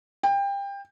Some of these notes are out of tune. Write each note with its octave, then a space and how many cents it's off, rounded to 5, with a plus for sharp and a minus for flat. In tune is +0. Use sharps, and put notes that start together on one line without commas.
G5 +25